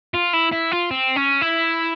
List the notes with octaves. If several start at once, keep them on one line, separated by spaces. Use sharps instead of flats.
F4
E4
E4
F4
C4
C#4
E4